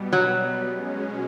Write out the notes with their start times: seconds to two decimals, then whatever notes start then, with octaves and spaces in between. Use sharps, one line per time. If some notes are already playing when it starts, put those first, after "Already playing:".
Already playing: B2 G3 B3
0.13 F#3
0.67 B2 G#3 C#4